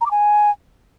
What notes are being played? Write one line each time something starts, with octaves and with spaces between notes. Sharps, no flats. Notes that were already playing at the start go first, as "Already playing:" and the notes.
A#5
D6
G#5